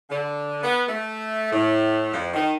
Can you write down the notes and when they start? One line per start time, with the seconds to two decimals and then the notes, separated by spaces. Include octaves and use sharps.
0.10 D3
0.63 B3
0.88 A3
1.52 A2
2.13 F2
2.34 D#3